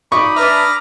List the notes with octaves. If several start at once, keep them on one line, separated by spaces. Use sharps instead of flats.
D#4 D5 B5 C#6 D#6
D4 B4 E5 A#5 D6 F6